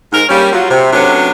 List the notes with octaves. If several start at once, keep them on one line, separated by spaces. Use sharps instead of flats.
G#2 A#4
G3 A#3 C#4
F#3 F4
C3
C3 F#3 A3 B3 C#4 D4